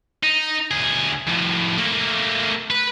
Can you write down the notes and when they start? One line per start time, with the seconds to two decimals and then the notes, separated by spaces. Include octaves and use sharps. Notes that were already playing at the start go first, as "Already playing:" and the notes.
0.23 D#4
0.71 D2 G#4
1.27 F2 A2
1.78 A3 A#3
2.70 B4